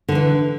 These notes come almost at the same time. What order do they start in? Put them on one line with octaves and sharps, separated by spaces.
D3 F3 E3